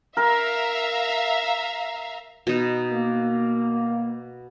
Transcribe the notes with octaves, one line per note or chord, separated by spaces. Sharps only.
A#4 E5 F5 A#5
B2 D#4
A#3